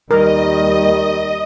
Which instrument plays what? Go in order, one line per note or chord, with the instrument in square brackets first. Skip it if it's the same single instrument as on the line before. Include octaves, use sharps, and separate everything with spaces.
[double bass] D#2 G3 [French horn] D#3 [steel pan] A#4 [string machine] D#5